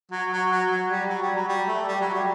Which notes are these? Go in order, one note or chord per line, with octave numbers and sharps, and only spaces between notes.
F#3
F#3
F#3
F#3
G3
F#3
G3
F#3
G3
A3
G3
F#3
G3